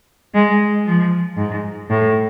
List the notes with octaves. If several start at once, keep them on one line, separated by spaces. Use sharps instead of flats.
G#3
F3
G#2
A2